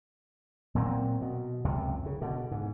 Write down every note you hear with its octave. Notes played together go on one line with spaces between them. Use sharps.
A#2 F#3 C4
B2
C#2 F#2 C3
C#3
B2 D3
G#2